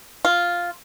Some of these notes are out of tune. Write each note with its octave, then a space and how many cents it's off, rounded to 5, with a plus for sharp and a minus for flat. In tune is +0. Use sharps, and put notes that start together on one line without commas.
F4 +0